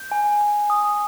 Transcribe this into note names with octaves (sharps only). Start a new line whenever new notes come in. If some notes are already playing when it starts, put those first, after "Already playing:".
Already playing: G6
G#5
G#5
D#6